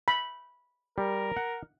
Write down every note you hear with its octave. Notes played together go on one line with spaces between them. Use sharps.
B5
G3 A#4
F#5